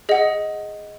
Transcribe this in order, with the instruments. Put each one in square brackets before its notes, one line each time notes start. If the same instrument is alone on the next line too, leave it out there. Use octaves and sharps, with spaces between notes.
[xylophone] G#4 D#5 F#5